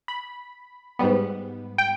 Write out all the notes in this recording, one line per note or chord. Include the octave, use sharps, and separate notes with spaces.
B5
G#2 G3 B3
G5